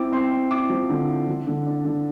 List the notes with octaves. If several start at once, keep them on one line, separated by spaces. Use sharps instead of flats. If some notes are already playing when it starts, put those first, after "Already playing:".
Already playing: C4 E4 D6
C4 C6
C4
E4 D6
F3
D3
E4
F3
D3
D4
D3